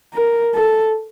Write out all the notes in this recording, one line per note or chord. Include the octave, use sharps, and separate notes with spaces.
A#4
A4